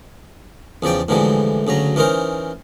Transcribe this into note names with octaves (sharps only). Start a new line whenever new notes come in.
E2 C#3 F3 D5 G5
A2 D3 E3 F3 G3 G#3
D2 C#3 F#3 A#5
E3 C#4 D#4 A#4 C5